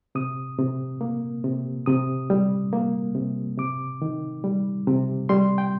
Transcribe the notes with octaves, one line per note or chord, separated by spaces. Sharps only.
C3 D#6
C3
A#3
C3
C3 D#6
G3
A#3
C3
C3 D6
D#3
G3
C3
G3 C6
G5